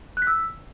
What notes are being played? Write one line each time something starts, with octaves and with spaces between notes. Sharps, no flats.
F#6
B6
E6